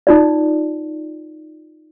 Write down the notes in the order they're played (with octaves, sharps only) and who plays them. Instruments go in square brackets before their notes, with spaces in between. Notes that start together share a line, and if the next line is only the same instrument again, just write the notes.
[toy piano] D#4 F4 D5